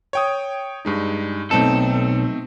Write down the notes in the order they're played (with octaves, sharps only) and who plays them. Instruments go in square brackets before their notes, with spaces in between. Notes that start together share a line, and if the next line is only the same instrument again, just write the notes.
[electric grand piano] C#5 G5 D#6
G2 G#3 D#4
[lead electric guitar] B1 A4 [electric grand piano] A3 C4 D#4